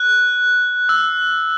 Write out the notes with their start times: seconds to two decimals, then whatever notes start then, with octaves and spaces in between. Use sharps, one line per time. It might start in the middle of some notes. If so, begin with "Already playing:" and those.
Already playing: F#6
0.89 E6